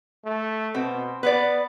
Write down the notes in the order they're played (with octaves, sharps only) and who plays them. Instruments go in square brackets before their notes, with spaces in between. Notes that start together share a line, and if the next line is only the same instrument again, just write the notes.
[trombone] A3
[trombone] B2 [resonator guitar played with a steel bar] C4
[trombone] B3 [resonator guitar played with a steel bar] B4 C5 D5